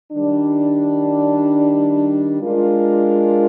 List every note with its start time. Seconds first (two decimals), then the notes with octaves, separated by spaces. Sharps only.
0.12 D#3 G3 D4
2.40 G#3 D4 F4 A#4